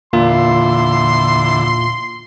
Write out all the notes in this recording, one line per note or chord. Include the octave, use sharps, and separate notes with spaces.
E2 A#2 D3 E4 F4 C6